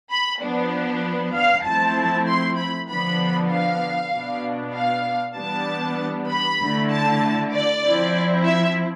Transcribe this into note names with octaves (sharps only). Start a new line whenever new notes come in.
B5
F3 B3 D4
F5
F3 A3 C4 E4 A5
C6
B5
D3 F3 B3 D4 B5
F5
B2 B3 D4
F5
E3 G3 B3 D4 A5
B5
D3 A3 E4
A5
D5
F3 C4 E4
E5